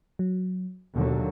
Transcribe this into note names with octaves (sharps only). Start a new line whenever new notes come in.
F#3
D#2 B2 D3 F#3